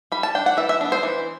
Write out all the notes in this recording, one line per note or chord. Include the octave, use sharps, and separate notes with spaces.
G3 B5
A5
D4 G5
F#5
E3 E5
E5
B3 D4
C5
E3